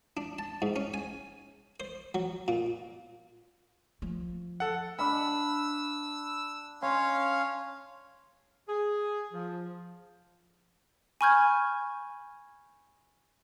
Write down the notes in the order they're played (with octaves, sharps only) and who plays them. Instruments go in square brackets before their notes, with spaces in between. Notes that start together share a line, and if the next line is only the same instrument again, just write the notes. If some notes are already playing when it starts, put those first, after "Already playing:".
[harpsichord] D4
A5
G#2
C#4
G#5
C5
F#3
A#2
[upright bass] F3
[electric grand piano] A4 F#5
[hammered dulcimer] D4 F5 B5 [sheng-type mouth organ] E6
[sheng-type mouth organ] C#4 C#5 F5 [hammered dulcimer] C6
[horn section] G#4
F3
[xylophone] G#5 B5 C#6 F6 G6 G#6